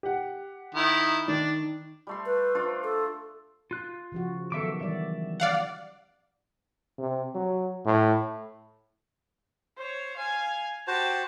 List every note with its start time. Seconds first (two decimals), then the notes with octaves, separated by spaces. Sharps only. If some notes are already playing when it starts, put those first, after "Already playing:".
0.03 G4 F#5
0.75 D#3 E4
1.28 D#3 D4
2.07 G3 A3 C6
2.26 B4
2.55 D4 F4 C5
2.84 A4
3.71 F4 F#6
4.12 C#3 F3 F#4
4.52 D#3 F#3 B3 A4 E5 D6
4.81 E3 G3 D5 E5
5.40 D5 F5 F#5
6.98 C3
7.35 F#3
7.85 A2
9.77 C5 C#5
10.16 F5 G#5
10.88 F#4 G4 C5 A5